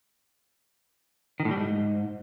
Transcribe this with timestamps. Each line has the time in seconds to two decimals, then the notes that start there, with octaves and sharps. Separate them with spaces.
1.40 D#3
1.45 A2
1.51 G3
1.57 G#2